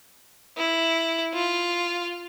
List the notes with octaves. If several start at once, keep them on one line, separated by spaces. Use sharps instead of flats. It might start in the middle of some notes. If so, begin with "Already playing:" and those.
E4
F4